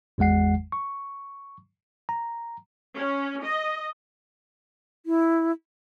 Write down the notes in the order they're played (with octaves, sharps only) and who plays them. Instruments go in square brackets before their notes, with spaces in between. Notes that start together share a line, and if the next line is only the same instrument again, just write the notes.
[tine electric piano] G#1 E2 G#3 F#5 C7
C#6
A#5
[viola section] C#4
D#5
[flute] E4